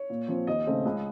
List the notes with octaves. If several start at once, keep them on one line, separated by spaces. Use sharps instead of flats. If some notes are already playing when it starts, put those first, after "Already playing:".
Already playing: C#5
A#2
F3 C4
D#2 D#5
C#3 A3 C4
C#2